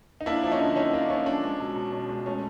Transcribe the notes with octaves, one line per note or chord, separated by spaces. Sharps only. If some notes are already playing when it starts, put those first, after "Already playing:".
D#4
A#3 D4 E4
F3
C#4 D#4
D3
C#4 D#4
A#3 D4
F3 C#4
C#4 D4
G#3
B2
B2
C#4
G#3
A3 C#4